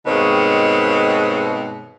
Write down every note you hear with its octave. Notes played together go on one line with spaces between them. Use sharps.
G2 B2 D#3 G#3 C4 C#5